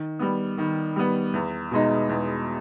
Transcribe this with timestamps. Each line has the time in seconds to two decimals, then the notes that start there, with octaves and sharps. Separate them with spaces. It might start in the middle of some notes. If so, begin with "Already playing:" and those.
Already playing: D#3
0.19 G3 B3
0.58 D#3
0.96 G3 B3
1.34 E2
1.71 B2 G#3 D#4
2.09 E2